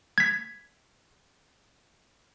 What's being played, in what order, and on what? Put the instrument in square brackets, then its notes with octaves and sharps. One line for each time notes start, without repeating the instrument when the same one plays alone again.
[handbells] G#6 B6